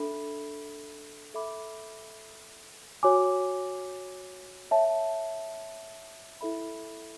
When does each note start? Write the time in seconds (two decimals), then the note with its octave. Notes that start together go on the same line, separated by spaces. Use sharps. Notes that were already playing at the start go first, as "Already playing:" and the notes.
Already playing: D4 A4 E5 B5
1.34 A4 E5 B5 D6
3.03 F#4 C#5 G#5 D6
4.71 C#5 E5 A5
6.41 E4 A4 E5 B5